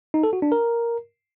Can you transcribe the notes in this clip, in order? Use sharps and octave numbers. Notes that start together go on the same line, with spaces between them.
D#4
A4
F#4
D4
A#4